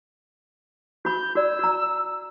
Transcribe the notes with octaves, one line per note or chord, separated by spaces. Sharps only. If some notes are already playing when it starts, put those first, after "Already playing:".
F#4 B5 G6
F#4 D5 E6
F#4 A#5